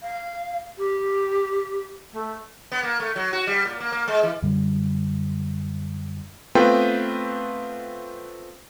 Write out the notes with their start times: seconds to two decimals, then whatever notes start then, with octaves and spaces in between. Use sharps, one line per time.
0.02 F5
0.78 G4
2.12 A3
2.72 B3
2.83 A#3
3.00 A3
3.16 F#3
3.33 F#4
3.47 G3
3.65 A#2
3.80 A#3
3.92 A#3
4.08 G#3
4.23 E3
4.42 F#2 D3 G3
6.55 A3 B3 C4 F4 B4 G5